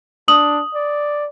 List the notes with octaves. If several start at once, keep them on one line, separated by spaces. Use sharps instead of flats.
D4 D#6 F#7
D5